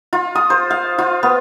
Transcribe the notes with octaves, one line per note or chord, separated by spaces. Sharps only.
F4
D#6
C5
F5
F4
B3